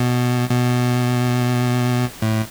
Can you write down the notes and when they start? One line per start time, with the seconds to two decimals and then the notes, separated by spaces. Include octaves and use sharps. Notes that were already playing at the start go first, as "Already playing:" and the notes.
Already playing: B2
0.51 B2
2.22 A2